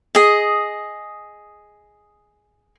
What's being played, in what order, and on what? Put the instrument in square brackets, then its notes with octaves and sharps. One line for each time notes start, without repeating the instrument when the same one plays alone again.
[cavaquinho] G#4 D#5